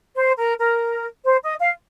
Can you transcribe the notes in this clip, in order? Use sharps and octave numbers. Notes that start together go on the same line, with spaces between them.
C5
A#4
A#4
C5
D#5
F5